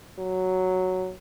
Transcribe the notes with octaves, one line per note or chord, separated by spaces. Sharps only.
F#3